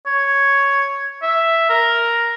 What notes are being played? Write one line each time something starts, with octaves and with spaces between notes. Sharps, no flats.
C#5
E5
A#4